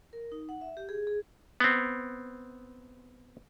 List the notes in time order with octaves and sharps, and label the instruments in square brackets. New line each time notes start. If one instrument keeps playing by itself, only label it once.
[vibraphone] A#4
D#4
F#5
E5
G4
G#4
G#4
[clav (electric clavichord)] B3 C4